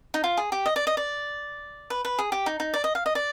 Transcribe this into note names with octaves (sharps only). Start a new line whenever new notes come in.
D#4
F4
G#4
G4
D#5
D5
D#5
D5
B4
B4
G#4
G4
D#4
D#4
D5
D#5
F5
D#5
D5